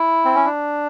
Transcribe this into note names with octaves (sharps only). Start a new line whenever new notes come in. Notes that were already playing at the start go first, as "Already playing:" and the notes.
Already playing: E4
C4
C#4
D4